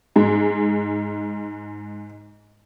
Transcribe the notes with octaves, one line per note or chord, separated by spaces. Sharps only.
G#2 G#3